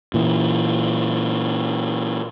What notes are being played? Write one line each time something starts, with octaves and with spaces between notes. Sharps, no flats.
A#2 E3